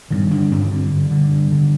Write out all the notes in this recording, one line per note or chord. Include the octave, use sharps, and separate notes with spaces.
G2 D#3
D3 D4
G2 C4
D3
G2
D3
G2
D3